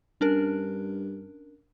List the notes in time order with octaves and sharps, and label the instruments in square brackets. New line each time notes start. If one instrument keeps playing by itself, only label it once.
[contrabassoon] G2 [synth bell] C#4 D4 A#4